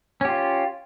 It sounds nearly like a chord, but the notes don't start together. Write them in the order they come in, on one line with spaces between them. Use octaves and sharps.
C#4 G4 F4